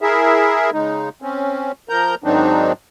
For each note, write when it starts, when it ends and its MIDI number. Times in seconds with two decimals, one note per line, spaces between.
0.01 0.70 64
0.01 0.70 68
0.01 0.70 70
0.01 0.70 76
0.73 1.09 49
0.73 1.09 56
0.73 1.09 63
1.22 1.72 60
1.22 1.72 61
1.89 2.15 53
1.89 2.15 70
1.89 2.15 82
1.89 2.15 91
2.24 2.72 44
2.24 2.72 51
2.24 2.72 54
2.24 2.72 60
2.24 2.72 62
2.24 2.72 63